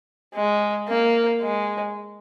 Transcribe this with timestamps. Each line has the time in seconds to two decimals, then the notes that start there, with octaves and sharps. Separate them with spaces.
0.34 G#3
0.89 A#3
1.41 G#3